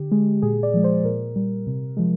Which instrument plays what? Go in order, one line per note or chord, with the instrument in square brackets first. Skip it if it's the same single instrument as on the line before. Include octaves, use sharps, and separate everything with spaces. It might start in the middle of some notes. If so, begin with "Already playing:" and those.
Already playing: [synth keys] D3 G4
G#3
A#2 G#4
D5
F3 G#3
C5
A#2 A#4
G3
C3
F3 G#3